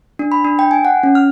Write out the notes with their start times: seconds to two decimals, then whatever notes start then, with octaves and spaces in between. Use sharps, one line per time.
0.19 D4
0.32 B5
0.44 D4
0.59 G5
0.71 G#5
0.85 F#5
1.03 C#4
1.15 F6